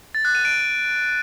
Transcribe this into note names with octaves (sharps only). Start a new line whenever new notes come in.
A6
F#6
D#7
D7